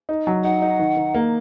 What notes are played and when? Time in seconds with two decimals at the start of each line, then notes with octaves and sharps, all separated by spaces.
0.09 D#4
0.27 F#3
0.44 D#4 F#5
0.62 D#4
0.79 D#3
0.97 D#3
1.14 A#3